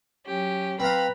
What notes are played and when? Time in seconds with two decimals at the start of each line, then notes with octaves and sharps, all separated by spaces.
0.25 F#3 C#4 G4
0.80 C4 B4 F5 A#5 B5